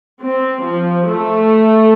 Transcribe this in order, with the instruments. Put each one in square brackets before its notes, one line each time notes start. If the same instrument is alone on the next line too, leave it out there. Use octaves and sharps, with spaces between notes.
[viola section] C4
F3
A3